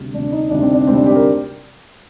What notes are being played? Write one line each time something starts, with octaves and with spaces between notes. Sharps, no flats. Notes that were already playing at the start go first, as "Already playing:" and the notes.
Already playing: D2 C3 G3
D2 C3 G3 D4
D#4
D2 C3 G3 D4
C4
D4
D2 C3 G3 C4
D4
G4
A#4